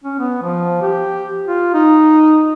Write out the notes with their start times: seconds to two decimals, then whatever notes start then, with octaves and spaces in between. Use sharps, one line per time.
0.04 C#4
0.19 B3
0.43 F3
0.82 G4
1.48 F4
1.74 D#4